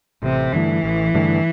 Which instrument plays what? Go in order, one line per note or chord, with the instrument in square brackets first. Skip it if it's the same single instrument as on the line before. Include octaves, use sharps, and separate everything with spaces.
[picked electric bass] A1 [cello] C3
[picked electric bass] G2 D3 A3 [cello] E3
[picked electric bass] A1
G2 D3 A3